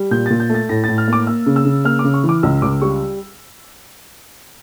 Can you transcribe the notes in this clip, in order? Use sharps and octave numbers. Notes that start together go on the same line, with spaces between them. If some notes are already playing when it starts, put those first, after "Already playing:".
Already playing: G3
A#2 G6
A6
A#2
G6
A3 A6
A2 A#6
A6
A2
F6
A#3 D6
A#3 E6
C#3
E6
C#3
A#3 F6
D6
C#3
C#6
E3
D6
C#2 E6
C#2 D6
G3 C#6